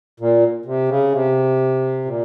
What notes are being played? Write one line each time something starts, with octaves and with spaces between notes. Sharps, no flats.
A#2
C3
C#3
C3
A#2